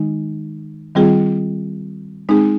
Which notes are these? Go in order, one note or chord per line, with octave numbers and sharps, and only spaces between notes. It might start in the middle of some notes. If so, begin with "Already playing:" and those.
Already playing: D#3 G#3 D#4
D#3 G3 C4 F4 G#4
G#3 C4 D#4 G#4